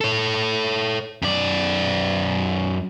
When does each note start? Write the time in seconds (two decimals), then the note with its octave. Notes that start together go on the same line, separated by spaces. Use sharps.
0.01 A4 C#5
1.22 F#2 D5